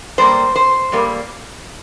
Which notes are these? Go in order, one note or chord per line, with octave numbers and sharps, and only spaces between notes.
G2 G3 A#3 C5
C5
G2 G3 A#3